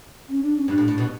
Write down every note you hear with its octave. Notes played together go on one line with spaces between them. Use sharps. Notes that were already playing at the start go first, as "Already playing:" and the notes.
C#4
D4
C#4
G2 D4
A2
A2
B2